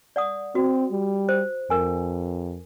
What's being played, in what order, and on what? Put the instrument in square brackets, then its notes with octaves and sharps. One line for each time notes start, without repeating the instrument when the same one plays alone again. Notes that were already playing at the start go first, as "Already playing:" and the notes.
[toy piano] D5 F#5 D#6
[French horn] C4 [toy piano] F#4
[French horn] G3
[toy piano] C5
[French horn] F2 [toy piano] A#4 G#5